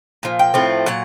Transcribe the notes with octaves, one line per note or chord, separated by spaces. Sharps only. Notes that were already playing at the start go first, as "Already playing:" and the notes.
A#2 F3
G5
A2 F3 A3 C4
A#2 F#3 F#5